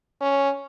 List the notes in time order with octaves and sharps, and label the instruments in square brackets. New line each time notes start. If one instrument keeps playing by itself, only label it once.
[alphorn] C#4